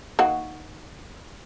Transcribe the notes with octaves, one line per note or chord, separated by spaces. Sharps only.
D#3 A#3 F#4